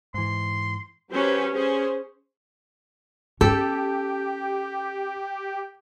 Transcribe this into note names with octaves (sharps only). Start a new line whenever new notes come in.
G#2 E3 C6
F#3 C#4 G4 B4 C5
C#4 G#4 C5
C#4 G4 A4